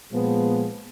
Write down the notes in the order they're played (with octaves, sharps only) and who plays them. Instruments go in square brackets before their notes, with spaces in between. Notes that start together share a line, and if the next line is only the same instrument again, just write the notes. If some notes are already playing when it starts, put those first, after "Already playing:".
[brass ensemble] A#2 F3 G#3 B3